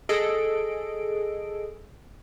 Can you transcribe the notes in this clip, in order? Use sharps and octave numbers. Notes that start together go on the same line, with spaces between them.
G#4 A4 D#5 D7